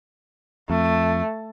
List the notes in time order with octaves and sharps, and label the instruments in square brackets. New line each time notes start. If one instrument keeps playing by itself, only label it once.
[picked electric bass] F2 [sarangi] A3